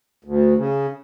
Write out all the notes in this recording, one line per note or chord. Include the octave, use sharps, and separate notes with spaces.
D2
C#3